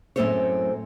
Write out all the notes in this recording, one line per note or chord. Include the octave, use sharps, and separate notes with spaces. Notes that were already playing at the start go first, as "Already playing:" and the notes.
F#2 A2 C4 A4 C5 C#5